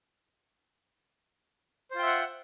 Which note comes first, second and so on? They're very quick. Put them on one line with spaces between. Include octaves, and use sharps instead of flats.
C5 F4 G5 E5 F#5